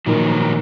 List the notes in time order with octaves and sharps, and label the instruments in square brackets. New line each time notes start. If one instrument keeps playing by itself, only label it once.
[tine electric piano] A#2 F3 A#3 D#4 A#4 [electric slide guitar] D#3 F#3